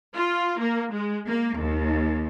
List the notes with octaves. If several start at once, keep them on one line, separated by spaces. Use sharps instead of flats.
F4
A#3
G#3
A#3
D#2